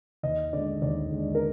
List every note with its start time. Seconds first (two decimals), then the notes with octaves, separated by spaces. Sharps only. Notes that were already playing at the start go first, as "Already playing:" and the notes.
0.23 D#2 D#5
0.53 D3 G#3 D5
0.82 D#2 D5
1.11 D3 G#3
1.35 A#4